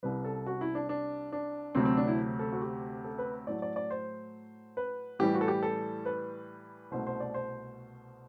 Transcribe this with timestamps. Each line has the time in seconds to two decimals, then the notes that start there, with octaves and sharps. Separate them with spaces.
0.03 C2 C3 G3 B4
0.25 A4
0.46 F#4
0.61 E4
0.75 D4
0.89 D4
1.32 D4
1.75 D2 C3 F#3 A3 C4
1.85 C4
1.97 D4
2.07 E4
2.39 A4
2.53 F#4
2.62 G4
3.04 A4
3.19 B4
3.47 A2 F#3 A3 D5
3.62 D5
3.76 D5
3.90 C5
4.77 B4
5.19 A2 E3 G3 G4
5.34 F#4
5.41 A4
5.48 G4
5.63 A4
6.06 B4
6.91 C2 B2 A3 C5
7.07 C5
7.20 D5
7.34 C5